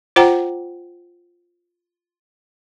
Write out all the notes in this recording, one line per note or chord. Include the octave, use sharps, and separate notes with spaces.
F4 C5 F#5 G5 A#5